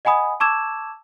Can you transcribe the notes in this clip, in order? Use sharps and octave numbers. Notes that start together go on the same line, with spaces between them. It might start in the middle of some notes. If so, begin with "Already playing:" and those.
D#5 F#5 G#5 B5 D#6
A5 C#6 D6 E6 G#6 E7